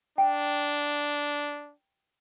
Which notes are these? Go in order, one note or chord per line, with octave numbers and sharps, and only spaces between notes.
D4 G5